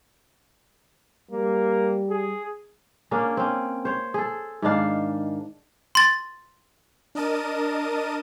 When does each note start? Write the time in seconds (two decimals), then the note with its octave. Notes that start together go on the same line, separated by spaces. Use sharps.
1.31 G3 A#3
2.10 G#4
3.11 A#3 C#4 D4 G#4
3.37 C4 C#4
3.85 C5 C#5
4.14 G#4 A4
4.62 G#2 D#3 D4 F5
5.95 C6 A6
7.15 D4 A#4 D#5 A5 D#7